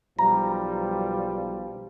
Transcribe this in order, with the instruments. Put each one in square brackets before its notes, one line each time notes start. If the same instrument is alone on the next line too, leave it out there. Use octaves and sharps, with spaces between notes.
[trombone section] B1 F3 G3 [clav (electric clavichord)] A#5